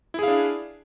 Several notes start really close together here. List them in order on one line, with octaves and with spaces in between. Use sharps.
E4 G#4 F5 D4